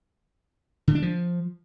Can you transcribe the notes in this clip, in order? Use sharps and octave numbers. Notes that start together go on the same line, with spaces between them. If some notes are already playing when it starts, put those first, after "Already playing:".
D3
D4
F3